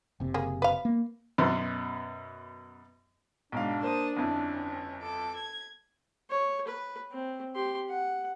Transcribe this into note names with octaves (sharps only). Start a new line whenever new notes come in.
F#1 C3
A#3 G#4
B4 F5
A#3
F#2 B2 B3 C6
B1 G#2 D4 F5
A#3 C5 A5 D#6
G1 F2 C#4 E4
A4 D6
G#6
C#5
B4
C4
G4 C6
F#5